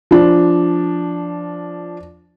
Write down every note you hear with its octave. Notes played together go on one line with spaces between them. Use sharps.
F3 D4